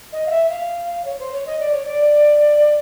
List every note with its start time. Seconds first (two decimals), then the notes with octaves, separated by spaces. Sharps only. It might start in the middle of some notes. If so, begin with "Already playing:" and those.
0.12 D#5
0.26 F5
0.30 E5
0.49 F5
1.04 C#5
1.19 C5
1.31 C#5
1.46 D#5
1.59 D5
1.71 C#5
1.84 D5